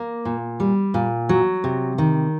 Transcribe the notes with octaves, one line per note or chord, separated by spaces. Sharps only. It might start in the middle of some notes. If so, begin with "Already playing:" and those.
Already playing: A#3
A#2
G3
A#2
F#3
C3
D#3